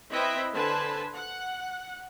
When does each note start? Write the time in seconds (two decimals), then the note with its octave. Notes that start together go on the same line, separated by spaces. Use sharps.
0.10 C4 E4 B4 D#5 E5 G5
0.54 D3 B4 C5 G#5 A5
1.14 F#5